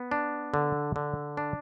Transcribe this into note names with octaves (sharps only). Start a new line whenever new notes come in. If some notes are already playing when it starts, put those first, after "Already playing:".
Already playing: B3
D4
D3
D3
D4